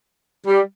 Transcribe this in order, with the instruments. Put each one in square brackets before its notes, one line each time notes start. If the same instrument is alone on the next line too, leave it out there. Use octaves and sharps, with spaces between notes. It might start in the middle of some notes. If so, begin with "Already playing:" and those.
[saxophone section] G3